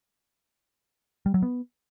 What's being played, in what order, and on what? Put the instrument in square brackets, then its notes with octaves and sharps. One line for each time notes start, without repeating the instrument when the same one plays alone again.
[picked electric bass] G3
F#3
B3